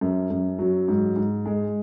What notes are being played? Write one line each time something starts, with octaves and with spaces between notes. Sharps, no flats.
F#2
F#2
F#3
G#2
G#2
G#3